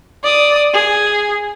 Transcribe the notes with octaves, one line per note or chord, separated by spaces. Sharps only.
D5 D#6
G#4